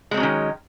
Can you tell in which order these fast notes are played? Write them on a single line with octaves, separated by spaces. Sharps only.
G#3 C4 F#3 C#4 D#3